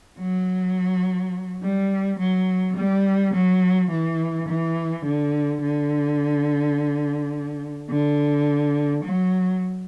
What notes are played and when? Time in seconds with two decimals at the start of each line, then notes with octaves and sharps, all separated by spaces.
0.19 F#3
1.63 G3
2.19 F#3
2.76 G3
3.34 F#3
3.91 E3
4.48 E3
5.05 D3
5.62 D3
7.90 D3
9.04 F#3